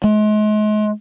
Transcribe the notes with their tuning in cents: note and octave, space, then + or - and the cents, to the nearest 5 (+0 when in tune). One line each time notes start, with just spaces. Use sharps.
G#3 +40